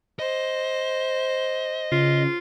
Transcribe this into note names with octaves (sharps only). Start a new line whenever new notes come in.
C5 D#5
C#3 F4